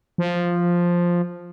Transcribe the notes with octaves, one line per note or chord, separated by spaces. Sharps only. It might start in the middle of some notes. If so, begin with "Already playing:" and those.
F3